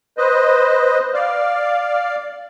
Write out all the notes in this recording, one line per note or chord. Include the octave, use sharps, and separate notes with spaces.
B4 C5 D#5
D5 F5